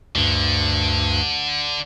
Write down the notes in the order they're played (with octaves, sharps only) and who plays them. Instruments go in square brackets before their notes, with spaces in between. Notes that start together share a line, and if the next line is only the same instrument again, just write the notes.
[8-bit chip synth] D2 G2 [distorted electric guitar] D3